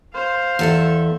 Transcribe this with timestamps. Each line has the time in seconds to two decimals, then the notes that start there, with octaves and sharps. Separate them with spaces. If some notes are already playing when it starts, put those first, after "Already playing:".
0.13 C5 F5
0.59 E2 A4 E5